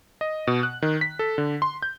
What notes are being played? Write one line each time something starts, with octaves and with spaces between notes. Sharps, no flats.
D#5
B2
F#6
D#3
B6
A4
D3
C6
G6